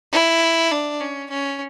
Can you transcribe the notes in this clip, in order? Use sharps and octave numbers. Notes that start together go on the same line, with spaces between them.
E4
D4
C#4
C#4